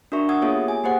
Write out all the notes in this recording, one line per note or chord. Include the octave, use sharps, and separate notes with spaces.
D4 F#4 A#4 E5 C#6
F#5 D#6 E6 G#6
A#3 B3 F4 G#4 C#5 E5
G4
G#5
A#3 G4 G#4 C5 F#5